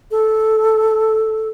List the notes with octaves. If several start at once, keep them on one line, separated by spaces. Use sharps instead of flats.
A4